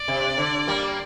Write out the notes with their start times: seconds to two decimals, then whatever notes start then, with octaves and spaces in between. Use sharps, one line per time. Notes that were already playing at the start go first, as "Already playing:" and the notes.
Already playing: D5
0.08 C3
0.38 D3
0.67 G3 A#3